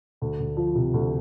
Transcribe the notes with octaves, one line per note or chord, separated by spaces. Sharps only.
D2
D2
F3
C3
D2